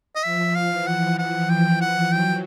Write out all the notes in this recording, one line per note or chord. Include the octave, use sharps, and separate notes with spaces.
D#5
F3 E5
F5
E3
F#5
F3 F#5
G5
F3
F#5
F#3 G5